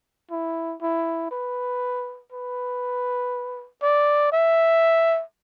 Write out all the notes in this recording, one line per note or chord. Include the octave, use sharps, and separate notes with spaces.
E4
E4
B4
B4
D5
E5